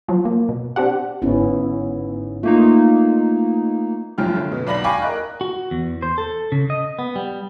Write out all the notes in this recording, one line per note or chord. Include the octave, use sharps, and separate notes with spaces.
F3 F#3
A#3
B2
C4 D4 G4 F#5
G1 G#2 B3 C#4 E4
A3 A#3 D#4 F4
F1 F#2 F3 G5 F6
D3
B2 D3
B1 D5 B5 A#6 F#7
F5 G5 G#5 B5 C#6 D6
A#4 D#5 F#6
F#4
E2
C5
A4
C#3
D#5
B3
G3